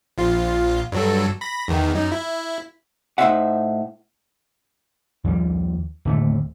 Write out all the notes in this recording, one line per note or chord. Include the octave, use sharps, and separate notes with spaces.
A#1 F4
G2 F#3 A4
B5 A#6
E2 D#3
F#2 D#4
E4
A2 D#4 E4 C5 E5 F#5
D#2 F3 G3
D1 D#2 A3